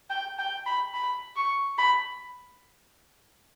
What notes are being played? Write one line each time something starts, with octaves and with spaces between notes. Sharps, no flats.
G5
G5
B5
B5
C#6
B5